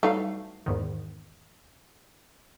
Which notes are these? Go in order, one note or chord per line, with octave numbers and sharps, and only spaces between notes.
E3 F#3 G3 A3 D#4 F5
E2 G#2 D#3